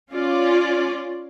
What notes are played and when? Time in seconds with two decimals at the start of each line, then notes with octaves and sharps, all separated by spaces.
0.12 C#4 F4 D5